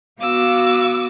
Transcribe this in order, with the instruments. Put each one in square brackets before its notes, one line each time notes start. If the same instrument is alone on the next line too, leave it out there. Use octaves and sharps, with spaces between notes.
[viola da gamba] B3 F#4 [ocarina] F5 [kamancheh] D6 E6